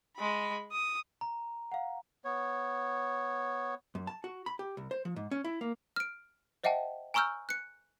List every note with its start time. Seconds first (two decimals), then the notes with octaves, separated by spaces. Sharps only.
0.16 G#3 B5
0.72 D#6
1.21 A#5
1.72 F5 F#5
2.25 B3 C#5
3.95 F#2
4.07 A5
4.24 F#4
4.46 B5
4.59 G4
4.77 C2
4.91 C5
5.05 F3
5.16 G#2
5.31 C#4
5.44 E4
5.61 A#3
5.96 F6 D7
6.64 C5 D#5 E5 F#5 G5 A5
7.14 G#5 A#5 C#6 E6 F6 G6
7.49 F#6 C#7